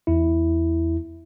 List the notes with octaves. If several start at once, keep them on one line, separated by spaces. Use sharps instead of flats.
E2 E4